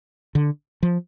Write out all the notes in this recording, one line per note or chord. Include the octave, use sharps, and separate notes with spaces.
D3
F3